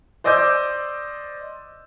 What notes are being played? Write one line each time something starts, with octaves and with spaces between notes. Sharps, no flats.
C5 D5 D#5 D6 E6 G6